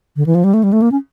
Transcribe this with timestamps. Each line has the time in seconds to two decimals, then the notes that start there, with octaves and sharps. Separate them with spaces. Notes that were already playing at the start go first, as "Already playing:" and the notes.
0.17 D3
0.26 E3
0.35 F3
0.44 G3
0.54 A3
0.63 G3
0.73 A3
0.82 A#3
0.92 C#4